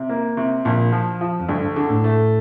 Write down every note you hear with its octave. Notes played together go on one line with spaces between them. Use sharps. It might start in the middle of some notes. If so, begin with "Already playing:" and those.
Already playing: C3
A#3
C3
A#1 A#2
F3
F3
F2
D2 G2
D3
A2
A3